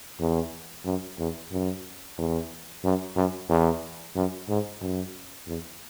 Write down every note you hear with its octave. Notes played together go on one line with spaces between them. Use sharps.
E2
F#2
E2
F#2
E2
F#2
F#2
E2
F#2
G#2
F#2
E2